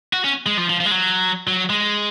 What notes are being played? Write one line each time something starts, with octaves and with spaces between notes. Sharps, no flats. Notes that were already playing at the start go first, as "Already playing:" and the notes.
F#4
C#4
G#3
F3
F3
F3
G#3
F#3
F#3
G#3